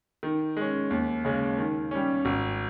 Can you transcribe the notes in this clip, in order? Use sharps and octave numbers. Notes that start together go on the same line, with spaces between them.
D#3
G#3 C#4
D#2
C#3 G#3 C#4
D#3
G3 C#4
G#1